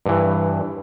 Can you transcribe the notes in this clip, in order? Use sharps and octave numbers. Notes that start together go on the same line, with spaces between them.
G2 E3